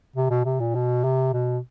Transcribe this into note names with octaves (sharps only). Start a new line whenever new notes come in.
C3
B2
C3
A#2
B2
C3
B2